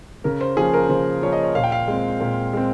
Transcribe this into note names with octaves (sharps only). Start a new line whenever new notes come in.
C#3 A#4
C5
F3 A#3 C#4 G#4
A#4
C#3 C5
F3 A#3 C#4 C#5
D#5
C#5
A#2 F5
G5
F5
G#3 C4
A#2
G#3 C4